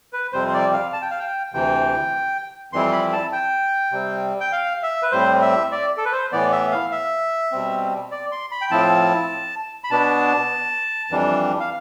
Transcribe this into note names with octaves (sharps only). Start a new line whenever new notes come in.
B4
F2 C3 G3 C4 C5
C5
D5
F5
A5
G5
F5
G5
D2 C3 E3 G5
F2 E3 G3 C4 E4 C6
B5
A5
G5
C3 G3 C4
G5
F5
E5
B4
A2 G3 C4 C5
E5
D5
A4
B4
C5
A2 E3 B3 D5
E5
F5
E5
B2 G3 C4
D5
C6
B5
G5
A2 F3 C4 E4 A5
B5
B2 B3 D4 A5
F2 E3 G3 D4
F5